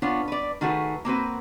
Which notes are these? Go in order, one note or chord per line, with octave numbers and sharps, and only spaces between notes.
B3 D4 F4 C#5
B4 D5
D#3 A3 F#4 G#4 B4
A#3 C4 F#4 B4